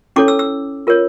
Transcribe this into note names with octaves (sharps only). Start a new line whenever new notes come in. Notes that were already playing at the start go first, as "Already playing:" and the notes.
C#4 E4 A4 C#5 D6
E6
E6
F4 A#4 C#5